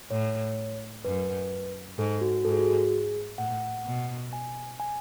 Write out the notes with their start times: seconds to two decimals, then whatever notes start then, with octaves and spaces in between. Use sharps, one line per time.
0.11 A2 C#5
1.05 F#2 B4
1.98 G#2 A4
2.21 F#4
2.45 G#2 A4
2.52 G#4
2.59 F#4
2.67 G#4
3.38 A2 F#5
3.85 B2
4.33 G#5
4.80 G#5